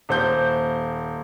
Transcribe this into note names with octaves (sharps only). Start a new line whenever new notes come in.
D#1 C5 G6